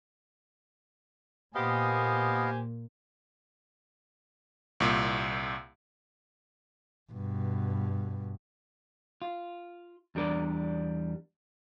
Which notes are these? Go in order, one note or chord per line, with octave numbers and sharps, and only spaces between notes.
A#2 A#3 B3 G4 C5 D#5 F5 G#5
C2 A#2
G2 B2
F4
E2 G3 D4 A#4 D5